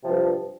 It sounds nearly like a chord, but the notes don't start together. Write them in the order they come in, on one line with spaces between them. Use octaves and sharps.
C3 F3 G2